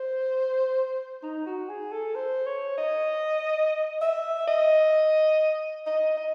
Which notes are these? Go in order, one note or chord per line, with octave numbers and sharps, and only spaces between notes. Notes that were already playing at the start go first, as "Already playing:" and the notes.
Already playing: C5
D#4
F#4
G#4
A4
C5
C#5
D#5
E5
D#5
D#5
D#5